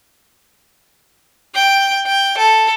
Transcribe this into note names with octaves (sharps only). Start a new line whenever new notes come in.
G5
G5
A4